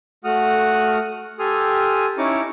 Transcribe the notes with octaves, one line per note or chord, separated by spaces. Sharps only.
A3 F#4 F#5 D#6 F6
G4 A4 G#5 C6 D#6 F6
C#4 D#4 E4 A#5 C#6 D6